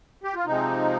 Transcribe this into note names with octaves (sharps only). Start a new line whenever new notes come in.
G4
F4
C3 F3 G#3 C4 D#4